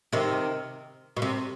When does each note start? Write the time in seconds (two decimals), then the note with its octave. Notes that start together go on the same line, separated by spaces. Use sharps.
0.13 C3 D#3
1.17 B2
1.22 C3